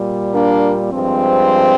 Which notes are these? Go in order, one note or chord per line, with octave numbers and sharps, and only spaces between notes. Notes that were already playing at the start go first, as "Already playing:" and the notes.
Already playing: A#2 G3
A#3 D4
G2 F3 G#3 C4